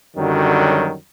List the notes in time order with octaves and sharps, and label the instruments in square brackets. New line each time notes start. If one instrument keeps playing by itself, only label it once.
[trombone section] F#2 D3 D#3 F#3 G3